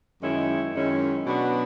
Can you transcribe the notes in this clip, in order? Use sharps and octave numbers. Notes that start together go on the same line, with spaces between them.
F#2 D#3 G#3 C#4 E4
F#2 D#3 G#3 C#4 E4
B2 F#3 B3 D4 F#4